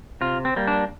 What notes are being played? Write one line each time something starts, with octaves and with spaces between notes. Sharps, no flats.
C3 F4
C4
G3 A#3
D4